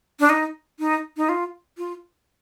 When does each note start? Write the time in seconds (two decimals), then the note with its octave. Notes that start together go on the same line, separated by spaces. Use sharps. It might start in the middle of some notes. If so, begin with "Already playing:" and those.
0.20 D4
0.29 D#4
0.79 D#4
1.17 D#4
1.29 F4
1.78 F4